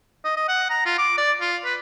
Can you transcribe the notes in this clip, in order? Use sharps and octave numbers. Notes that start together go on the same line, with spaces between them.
D#5
D#5
F#5
A#5
F4
D6
D5
F4
B4